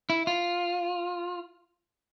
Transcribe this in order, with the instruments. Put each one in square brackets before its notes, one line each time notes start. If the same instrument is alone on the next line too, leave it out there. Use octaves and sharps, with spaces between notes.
[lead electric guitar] E4
F4